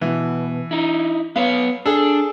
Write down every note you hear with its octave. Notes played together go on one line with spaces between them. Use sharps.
B2 E3
D#4 E4
B3 B4 C#5 F5
D4 G#4 A4